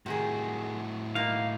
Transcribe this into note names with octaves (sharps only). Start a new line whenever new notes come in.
A2 C3 D#3 F#4 G#4
B2 A#3 D#4 F5